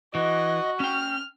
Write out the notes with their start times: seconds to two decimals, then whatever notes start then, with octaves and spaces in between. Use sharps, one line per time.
0.15 E3 F#4 D#5
0.80 C#4 G5 F6